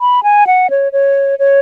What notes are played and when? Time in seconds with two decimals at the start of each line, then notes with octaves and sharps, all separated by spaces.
0.01 B5
0.23 G#5
0.47 F#5
0.70 C#5
0.93 C#5
1.39 C#5